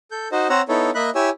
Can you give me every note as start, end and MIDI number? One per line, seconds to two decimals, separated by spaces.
0.11 0.28 69
0.11 0.28 91
0.32 0.48 63
0.32 0.48 66
0.32 0.48 72
0.32 0.48 75
0.50 0.62 60
0.50 0.62 72
0.50 0.62 73
0.50 0.62 78
0.50 0.62 82
0.50 0.62 88
0.69 0.90 59
0.69 0.90 63
0.69 0.90 64
0.69 0.90 69
0.69 0.90 73
0.95 1.10 58
0.95 1.10 75
0.95 1.10 76
0.95 1.10 83
0.95 1.10 90
1.15 1.30 64
1.15 1.30 67
1.15 1.30 73
1.15 1.30 80
1.15 1.30 88